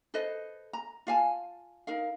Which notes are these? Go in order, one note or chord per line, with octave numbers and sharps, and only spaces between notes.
A4 B4 C5 D#5
A#5
F4 F5 G#5 A5
D#4 A#4 F5